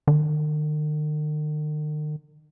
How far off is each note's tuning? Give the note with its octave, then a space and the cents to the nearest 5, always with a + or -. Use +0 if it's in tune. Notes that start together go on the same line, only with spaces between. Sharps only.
D#3 -45